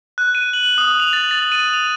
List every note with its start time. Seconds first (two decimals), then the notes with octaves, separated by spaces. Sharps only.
0.18 F#6
0.35 D#7
0.53 F#7
0.78 D#6
1.00 F7
1.13 A6
1.31 A6
1.52 D#7
1.73 F7